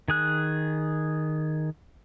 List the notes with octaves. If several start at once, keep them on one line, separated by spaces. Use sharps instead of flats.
D#3 G#4 F#6